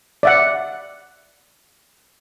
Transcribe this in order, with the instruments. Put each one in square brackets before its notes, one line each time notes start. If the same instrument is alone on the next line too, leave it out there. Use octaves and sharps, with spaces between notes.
[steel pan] D5 E5 F#5